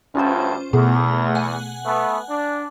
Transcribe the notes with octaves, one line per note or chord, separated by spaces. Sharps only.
D2 G2 C#4 F4 C5
E2 B2 A3 B3 G#4
F#5 G#5 F#6
A3 B3
D4